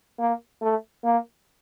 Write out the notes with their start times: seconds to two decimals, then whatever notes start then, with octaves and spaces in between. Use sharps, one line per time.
0.19 A#3
0.62 A3
1.04 A#3